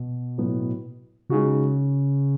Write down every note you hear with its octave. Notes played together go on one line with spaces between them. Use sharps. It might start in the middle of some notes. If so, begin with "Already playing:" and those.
Already playing: B2
A2 F#3 B3
C#3 G#3 D#4 F#4